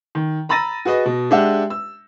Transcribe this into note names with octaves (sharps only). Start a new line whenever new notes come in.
D#3
A#5 B5 E6 A6 A#6 D#7
F#4 G#4 B4 D#5
B2
G#3 D4 G4 E5 F#5
E6